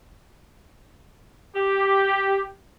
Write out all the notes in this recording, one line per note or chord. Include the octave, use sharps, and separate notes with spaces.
G4